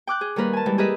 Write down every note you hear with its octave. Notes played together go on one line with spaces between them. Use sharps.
G5 D6 F#6 G6
G#4
D#3 G3 A#3 A#4 B4
G#5 A5
E3 G3 G#3
G4 G#4 A#4 B4 D#5 E5